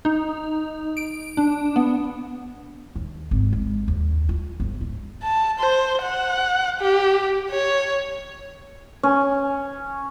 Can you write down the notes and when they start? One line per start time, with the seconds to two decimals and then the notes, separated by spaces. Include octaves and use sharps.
0.05 D#4
0.97 D7
1.37 D4
1.76 B3
2.96 D#2
3.31 G#1
3.53 G#3
3.88 D#2
4.29 F4
4.60 G1
4.81 G#2
5.23 A5
5.59 C5
6.03 F#5
6.80 G4
7.50 C#5
9.03 C#4